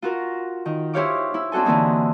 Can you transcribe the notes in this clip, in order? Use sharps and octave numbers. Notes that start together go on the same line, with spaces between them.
F4 F#4 A#4
D#3
E4 G4 C5 C#5 F5 D6
E4
C4 D4 F#4 A4 G#5
D3 E3 A#3 C4 D#4